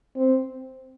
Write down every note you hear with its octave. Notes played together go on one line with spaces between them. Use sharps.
C4